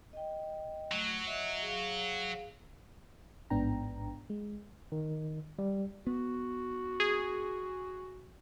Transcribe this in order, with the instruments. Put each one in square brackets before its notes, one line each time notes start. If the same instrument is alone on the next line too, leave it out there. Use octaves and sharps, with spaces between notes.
[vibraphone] D#5 G5
[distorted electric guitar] F#3 [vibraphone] A3
[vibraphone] D#5 E5
G#4 F5
[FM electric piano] A1 G#2 B3 D4 G5 A#5
G#3
[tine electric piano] D#3
G3
[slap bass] B3 [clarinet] F#4
[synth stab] G#4